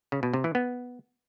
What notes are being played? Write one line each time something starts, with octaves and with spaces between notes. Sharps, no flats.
C#3
B2
C3
E3
B3